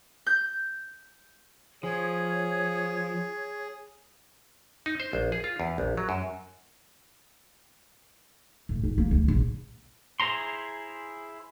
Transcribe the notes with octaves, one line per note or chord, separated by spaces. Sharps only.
G6
F3 G#4 C#5
D#4
C5
A#1
G#4
F4
E2
A#1
F#3
F#2
A2
G#2
A#3
D2
A#1
E4 G#4 C5 A#5 C6